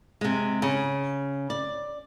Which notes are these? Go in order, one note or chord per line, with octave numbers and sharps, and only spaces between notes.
C3 G#3
C#3
D5